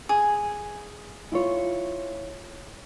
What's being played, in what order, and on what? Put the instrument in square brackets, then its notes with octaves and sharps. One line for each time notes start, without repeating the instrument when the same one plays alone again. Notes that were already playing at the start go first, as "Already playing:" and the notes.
[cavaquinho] G#4
[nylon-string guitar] E4 F4 C#5